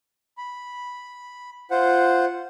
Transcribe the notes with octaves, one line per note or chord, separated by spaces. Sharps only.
B5
F4 C5 F#5